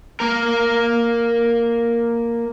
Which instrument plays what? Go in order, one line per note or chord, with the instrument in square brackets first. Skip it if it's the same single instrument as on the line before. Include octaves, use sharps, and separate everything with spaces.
[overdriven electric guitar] A#3 A#4